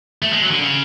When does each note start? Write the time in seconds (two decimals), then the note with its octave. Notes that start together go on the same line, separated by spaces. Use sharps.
0.22 A3
0.32 G#3
0.42 F#3
0.51 D3
0.61 C#3